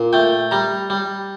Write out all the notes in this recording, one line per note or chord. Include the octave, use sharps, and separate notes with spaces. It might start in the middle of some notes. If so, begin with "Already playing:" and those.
Already playing: A#2
A3 G5
G3 A#5
G3